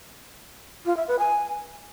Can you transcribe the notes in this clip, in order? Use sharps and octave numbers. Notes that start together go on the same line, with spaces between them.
F4
E5
B4
G#5